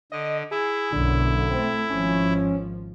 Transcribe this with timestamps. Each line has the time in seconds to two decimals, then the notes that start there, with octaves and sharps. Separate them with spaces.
0.12 D3 D#5
0.51 E4 G#4
0.92 B1 F#2 D3
1.52 A3 C4
1.90 G#1 F3 C#4